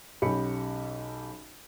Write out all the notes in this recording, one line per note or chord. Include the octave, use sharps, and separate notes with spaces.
B1 C#4 G4 B5 C#7